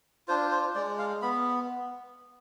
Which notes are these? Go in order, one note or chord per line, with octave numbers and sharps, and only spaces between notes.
D4 F4 C5
C5
G#3 D5
F5
B3 B5